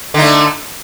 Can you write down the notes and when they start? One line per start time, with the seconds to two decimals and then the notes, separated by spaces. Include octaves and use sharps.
0.14 D3
0.18 D#4
0.22 A3